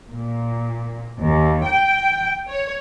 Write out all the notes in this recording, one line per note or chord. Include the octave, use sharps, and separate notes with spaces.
A#2
D#2
G5
C#5